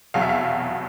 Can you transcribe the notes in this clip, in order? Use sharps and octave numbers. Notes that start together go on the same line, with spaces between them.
F1 E2 B2 F#3 F5
E5
F5